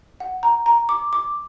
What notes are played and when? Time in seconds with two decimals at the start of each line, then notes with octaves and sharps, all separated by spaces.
0.20 F#5
0.43 A#5
0.66 A#5
0.89 D6
1.13 D6